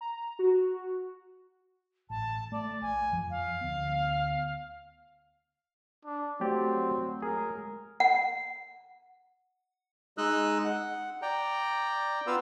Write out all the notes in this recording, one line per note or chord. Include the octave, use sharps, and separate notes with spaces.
A#5
F#4
A1 A5
A3 D5
A#1 G#5
F2 F3
F5
D2 B3
D4
F#3 A3 C4 G4 D5
G#3 G#4 A#4
F#5
G#3 D#4 D#5 E6 F#6
F#5
D5 G5 A#5
B3 F4 B4 F5 E6